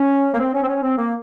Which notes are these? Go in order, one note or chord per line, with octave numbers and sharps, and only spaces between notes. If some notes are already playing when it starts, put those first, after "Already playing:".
Already playing: C#4
A#3
C4
C#4
C4
C#4
C4
A#3